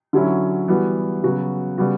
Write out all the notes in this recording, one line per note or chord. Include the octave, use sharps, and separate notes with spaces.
D3 F#3 C#4 E4
E3 G3 B3 F#4
C#3 F#3 B3 F#4
C#3 G3 B3 F#4